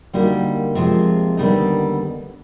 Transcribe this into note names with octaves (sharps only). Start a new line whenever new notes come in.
D3 G3 A#3 D#4 F#4
C3 F3 G#3 C4
D#2 D3 G3 B3 D#4